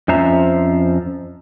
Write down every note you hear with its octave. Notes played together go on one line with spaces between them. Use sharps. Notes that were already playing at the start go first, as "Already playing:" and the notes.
F2 F3 C#4 C5 E5 A#5